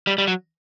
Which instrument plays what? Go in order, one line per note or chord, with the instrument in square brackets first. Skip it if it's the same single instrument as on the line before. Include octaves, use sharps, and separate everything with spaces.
[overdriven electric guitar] G3
G3
F#3